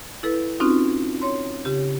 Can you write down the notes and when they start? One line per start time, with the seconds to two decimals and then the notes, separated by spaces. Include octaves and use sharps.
0.23 E4 A4 B4
0.60 C4 C#4 D#4 F4 F#4
1.22 C#5 C6
1.65 C#3 G4